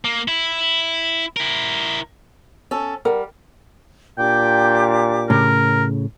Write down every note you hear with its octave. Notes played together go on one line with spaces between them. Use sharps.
A#3
E4
E4 A#4
C#4 A4
G3 A#4 F#5
A#2 D4 G4 G5 D6
A2 C#3 A#4